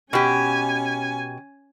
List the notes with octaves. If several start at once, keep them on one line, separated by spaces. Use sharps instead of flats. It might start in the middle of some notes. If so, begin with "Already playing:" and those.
B2 C#4 G4 G#5